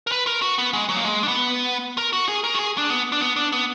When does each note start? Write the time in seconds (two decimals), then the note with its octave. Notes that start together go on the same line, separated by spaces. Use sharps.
0.07 A#4
0.12 B4
0.27 A#4
0.42 F#4
0.58 B3
0.73 G#3
0.89 F#3
0.97 A#3
1.04 G#3
1.23 D4
1.28 B3
1.98 A#4
2.13 F#4
2.28 G#4
2.44 A#4
2.55 F#4
2.59 G#4
2.78 D4
2.90 B3
3.12 D4
3.21 B3
3.36 D4
3.52 B3